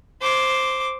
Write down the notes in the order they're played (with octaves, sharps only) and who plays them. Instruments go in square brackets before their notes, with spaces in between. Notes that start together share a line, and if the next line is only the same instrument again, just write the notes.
[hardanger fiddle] C5 D6